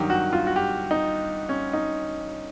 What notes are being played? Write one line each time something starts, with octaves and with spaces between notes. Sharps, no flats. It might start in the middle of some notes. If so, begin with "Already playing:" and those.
Already playing: G2 D#3 F#3 G4
F#4
F4
F#4
G4
D#4
C#4
D#4